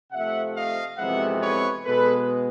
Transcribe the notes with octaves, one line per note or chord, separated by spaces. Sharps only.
C3 F3 A3 E5 F#5
D#5 F5
F2 C3 E3 G#3 B3 E5 F#5
B4 C#5
B2 G#3 B3 A4 B4